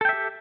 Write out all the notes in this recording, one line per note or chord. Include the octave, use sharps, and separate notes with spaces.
G4 A4 E5 G5